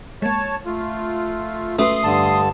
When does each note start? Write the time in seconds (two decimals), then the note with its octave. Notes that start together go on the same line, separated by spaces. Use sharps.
0.22 G#3 A#3 C#5 A5
0.66 A3 F4
1.79 A3 C#4 F#4 B4 C6 D#6
2.04 G2 D3 A5